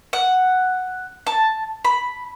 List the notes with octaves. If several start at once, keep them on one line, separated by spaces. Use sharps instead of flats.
F#5
A5
B5